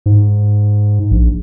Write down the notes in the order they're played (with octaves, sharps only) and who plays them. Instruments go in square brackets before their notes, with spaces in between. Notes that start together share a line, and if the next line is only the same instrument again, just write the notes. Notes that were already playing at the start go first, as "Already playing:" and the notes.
[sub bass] G#2
A#1